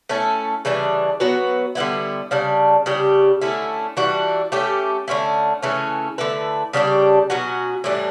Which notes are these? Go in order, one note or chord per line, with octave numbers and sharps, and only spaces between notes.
A3 C#4 E4 A4
C#3 E3 G3 D4
F#3 B3 F#4 B4
D3 G3 B3 E4
C#3 G3 D4
C#3 G3 D4 G4
D3 A3 C#4 E4
E3 G3 D4 F#4
A3 C#4 G4
D3 A3 C#4 E4
C#3 E3 A3 C#4
D3 A3 E4 B4
C#3 G3 D4 G4
B2 F#3 C#4 F#4
A2 E3 G3 D4